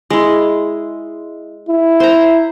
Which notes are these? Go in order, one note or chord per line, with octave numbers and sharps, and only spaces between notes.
G#3 E4
E4
C5 A#5